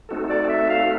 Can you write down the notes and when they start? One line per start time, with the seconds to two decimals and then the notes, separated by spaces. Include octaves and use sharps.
0.09 A3 C4 D#4 F#4 A4
0.29 D5
0.49 E5
0.70 F5